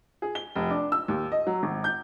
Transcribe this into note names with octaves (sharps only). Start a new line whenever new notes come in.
G#4
G7
F1
D4
E6
D#2
D#5
F#3
G#1
G6